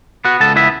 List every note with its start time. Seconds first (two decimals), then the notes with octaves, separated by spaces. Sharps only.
0.25 B3 F#4 F#5
0.40 C#2 A4 A5
0.56 B3 E4 E5